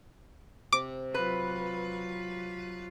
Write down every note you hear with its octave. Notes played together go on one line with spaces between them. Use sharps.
C3 D6
F#3 F4 B4